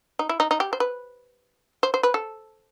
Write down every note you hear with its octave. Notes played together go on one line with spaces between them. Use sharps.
D#4
E4
D#4
D#4
G4
C5
B4
C5
C5
B4
A4